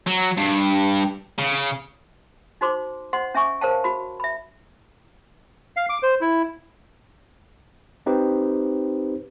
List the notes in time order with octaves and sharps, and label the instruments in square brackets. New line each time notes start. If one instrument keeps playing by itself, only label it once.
[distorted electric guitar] F#3
G2
C#3
[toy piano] D#4 F#4 C5 C6 D6
C5 D#5 F#5 C6
C#4 E5 G#5 C#6 D6
A#4 C5 C#5 F5 G5 A5
F#4 B5
E5 B5
[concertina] F5
D6
C5
E4
[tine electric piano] C4 D#4 G4 B4 C5